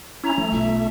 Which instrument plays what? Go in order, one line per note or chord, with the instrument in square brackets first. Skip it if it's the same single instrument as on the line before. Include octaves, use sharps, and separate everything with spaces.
[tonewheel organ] C#4 E4 [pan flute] A#5
[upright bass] F3 [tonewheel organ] A3
[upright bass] B1 F4 [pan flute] E5